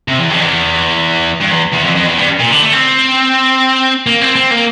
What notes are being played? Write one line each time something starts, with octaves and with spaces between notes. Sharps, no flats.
C3
E2
F2
E2
G2
E2
E2
F2
F2
E2
G2
A#2
D3
A3
C4
A#3
C4
C4
A#3